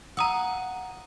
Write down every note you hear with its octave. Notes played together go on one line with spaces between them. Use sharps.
F5 F#5 A#5 D#6 E6